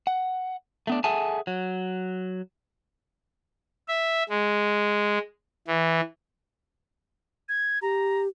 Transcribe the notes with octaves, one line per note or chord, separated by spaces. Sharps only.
F#5
A3 B3 D4
G#4 A4 E5 F#5 G#5 A5
F#3
E5
G#3
E3
G#6
G4 A#5